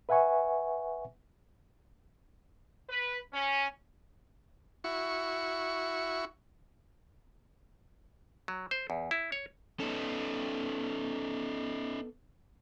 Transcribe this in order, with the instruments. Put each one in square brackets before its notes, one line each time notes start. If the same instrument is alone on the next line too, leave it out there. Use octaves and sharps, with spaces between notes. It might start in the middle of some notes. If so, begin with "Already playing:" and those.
[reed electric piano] B4 E5 F#5 G#5 C#6
[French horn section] B4
C#4
[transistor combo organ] E4 F#4 C#6
[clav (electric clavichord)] F#3
C5
E2
E4
C#5
[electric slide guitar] B3 A4 [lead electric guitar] C#4 D#4